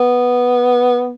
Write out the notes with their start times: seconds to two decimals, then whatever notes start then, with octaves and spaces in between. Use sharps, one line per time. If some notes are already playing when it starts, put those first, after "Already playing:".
Already playing: B3